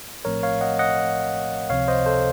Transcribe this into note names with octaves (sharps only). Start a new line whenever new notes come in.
A#1 A2 F3 A3 C4 A#4 C#5
C#5 F5
D#5 F#5
D#5 F#5
C#2 C3 F3 C4 C#5 F5
C5 D#5
A4 C5